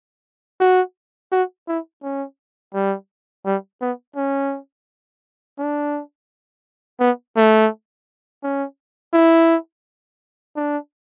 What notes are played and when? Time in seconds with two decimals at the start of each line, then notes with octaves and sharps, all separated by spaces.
0.60 F#4
1.32 F#4
1.68 E4
2.03 C#4
2.74 G3
3.45 G3
3.81 B3
4.16 C#4
5.58 D4
7.00 B3
7.36 A3
8.43 C#4
9.14 E4
10.56 D4